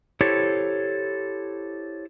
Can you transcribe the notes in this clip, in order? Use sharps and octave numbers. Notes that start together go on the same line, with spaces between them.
E4 G4 A4 C5 C#5